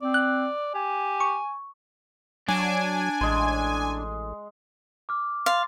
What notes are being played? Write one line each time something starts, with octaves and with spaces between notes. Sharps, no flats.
C4 D5
F#6
G4 G#5
C#6
F#3 D4 G#5
A1 G#3 C6
D6 F6
F5 C6 A6